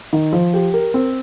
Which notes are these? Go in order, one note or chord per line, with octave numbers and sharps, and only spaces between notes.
D#3
F3
G4
A#4
C4